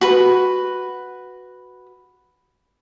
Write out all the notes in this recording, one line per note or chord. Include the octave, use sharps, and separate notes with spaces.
F#4 B4